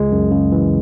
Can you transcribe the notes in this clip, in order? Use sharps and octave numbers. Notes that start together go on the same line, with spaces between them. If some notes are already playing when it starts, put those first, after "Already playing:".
Already playing: C#2 G#3
F#2
C#3
E3